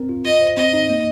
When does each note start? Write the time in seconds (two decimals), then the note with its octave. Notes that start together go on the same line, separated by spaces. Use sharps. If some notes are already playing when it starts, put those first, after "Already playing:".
Already playing: C4 A#4
0.09 F4
0.25 F4 D#5
0.41 C5
0.57 C4 D#5
0.73 D#4
0.90 A#3